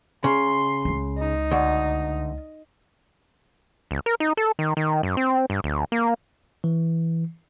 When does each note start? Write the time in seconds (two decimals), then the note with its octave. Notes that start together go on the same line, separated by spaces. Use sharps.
0.24 C#3 C6
0.85 C#2 F4
1.18 D#4
1.51 D2
3.91 C#2
4.06 A#4
4.20 D#4
4.37 A4
4.59 D#3
4.77 D#3
5.03 F#2
5.17 C4
5.50 G2
5.64 D2
5.92 A#3
6.64 E3